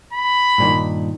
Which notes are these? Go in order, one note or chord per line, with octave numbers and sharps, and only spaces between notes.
B5
G2 A#2 D#3